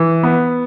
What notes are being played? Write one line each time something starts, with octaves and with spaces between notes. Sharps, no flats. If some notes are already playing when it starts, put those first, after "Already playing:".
Already playing: E3
B3